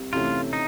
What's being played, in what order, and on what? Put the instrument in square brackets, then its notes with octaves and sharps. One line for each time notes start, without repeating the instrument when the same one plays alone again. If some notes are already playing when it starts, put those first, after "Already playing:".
Already playing: [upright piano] C2
[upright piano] C3 E3 A3 C#4 [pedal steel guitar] F4
[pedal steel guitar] D#4